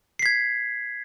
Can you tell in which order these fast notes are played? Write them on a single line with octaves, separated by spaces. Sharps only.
C7 B6 G#6